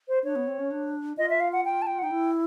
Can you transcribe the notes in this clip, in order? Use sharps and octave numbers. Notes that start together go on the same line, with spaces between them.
C5
D4 C#5
B3
C4
C#4
D4
F4 D#5
E5
F5
F#5
G5
A5
G5
F#5
D#4 G5
E4